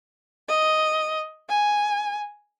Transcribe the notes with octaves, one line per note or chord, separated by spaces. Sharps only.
D#5
G#5